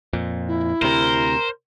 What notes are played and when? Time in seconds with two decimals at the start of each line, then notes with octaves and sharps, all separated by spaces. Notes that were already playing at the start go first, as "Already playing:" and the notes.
0.13 F2 A#2
0.48 E4
0.82 D2 C3 A#4 C5